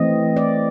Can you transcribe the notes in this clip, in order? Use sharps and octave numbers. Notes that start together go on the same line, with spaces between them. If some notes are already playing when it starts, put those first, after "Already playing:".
Already playing: E3 A3 C4 D#5
D5